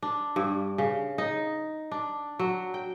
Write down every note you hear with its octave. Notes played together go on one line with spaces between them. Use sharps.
D4
G2
C#3
D#4
D4
F#3
G5